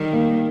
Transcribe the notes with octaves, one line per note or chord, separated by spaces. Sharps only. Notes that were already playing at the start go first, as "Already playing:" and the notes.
Already playing: D#3 G3
A#3